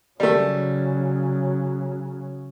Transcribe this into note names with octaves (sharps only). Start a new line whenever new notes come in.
C#3 F#3 G3 A3